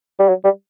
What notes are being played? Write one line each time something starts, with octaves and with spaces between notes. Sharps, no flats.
G3
F#3
G3